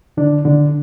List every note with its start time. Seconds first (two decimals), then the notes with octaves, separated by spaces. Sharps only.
0.17 D3 D4
0.45 D3 D4